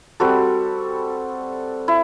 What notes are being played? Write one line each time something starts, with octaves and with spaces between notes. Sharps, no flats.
G3 C4 F#4 A4
E4